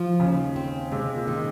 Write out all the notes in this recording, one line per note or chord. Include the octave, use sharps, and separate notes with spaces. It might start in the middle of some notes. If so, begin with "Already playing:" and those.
Already playing: F3
D#2 C#3
C4
C3 G#3
A#2
D#3